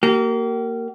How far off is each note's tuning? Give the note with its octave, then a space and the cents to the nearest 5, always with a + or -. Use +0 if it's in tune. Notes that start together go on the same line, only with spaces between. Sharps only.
A#3 -15 G4 -40